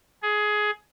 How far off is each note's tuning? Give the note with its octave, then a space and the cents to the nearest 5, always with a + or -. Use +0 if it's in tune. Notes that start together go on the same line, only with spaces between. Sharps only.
G#4 +15